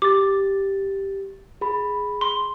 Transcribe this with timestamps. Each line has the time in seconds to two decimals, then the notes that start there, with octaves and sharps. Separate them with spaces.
0.02 G4 D6 A6
1.61 G#4 B5
2.21 C6